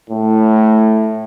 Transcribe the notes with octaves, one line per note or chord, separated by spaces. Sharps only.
A2